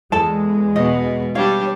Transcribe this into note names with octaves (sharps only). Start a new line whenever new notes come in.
E2 G#3 A4 A5
B2 D#5
G3 D4 C#5 F5